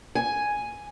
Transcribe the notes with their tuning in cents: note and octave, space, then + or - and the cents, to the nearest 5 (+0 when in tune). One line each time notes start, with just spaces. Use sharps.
G#5 +0